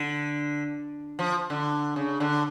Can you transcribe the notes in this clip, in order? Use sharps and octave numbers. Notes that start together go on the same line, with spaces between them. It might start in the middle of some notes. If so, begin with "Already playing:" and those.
Already playing: D3
F3
D3
C#3
D3